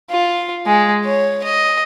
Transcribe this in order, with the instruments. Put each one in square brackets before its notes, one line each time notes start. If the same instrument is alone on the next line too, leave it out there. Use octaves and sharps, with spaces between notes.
[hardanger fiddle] F4
G#3
C#5
D#5